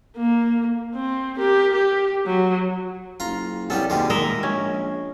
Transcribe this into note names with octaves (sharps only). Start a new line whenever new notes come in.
A#3
C4
G4 A#4
G4
F#3
F#1 F4 A#5
C2 G3 B3 C#4 A4
D#2 B2 G3 G#3
G#3 A#4 D#5 E5
A#1 C#4